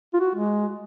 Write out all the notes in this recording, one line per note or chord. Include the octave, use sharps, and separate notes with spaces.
F4
F#4
G#3